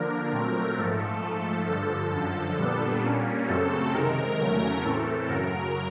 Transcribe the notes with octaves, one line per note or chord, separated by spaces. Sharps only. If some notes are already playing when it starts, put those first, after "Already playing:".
Already playing: D3 F3 A#3 D4 A#4
A#2 F#3 A3 C4
G#2 F3 A3 A4
G#2 F3 A3
G2 D3 F3 A4
F#2 D3 F3
A#2 G3 B3 D4
A#2 G3 A#3 C#4
F#2 C#3 F#3 A3 C4 A4
C3 D#3 G#3 A#4
E2 C#3 F#3 A3 C#4
A2 E3 A3 C4 A4
F#2 C#3 F#3 A#4